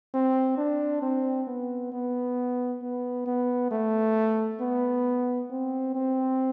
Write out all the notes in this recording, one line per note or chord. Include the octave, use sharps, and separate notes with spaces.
C4
D4
C4
B3
B3
B3
B3
A3
B3
C4
C4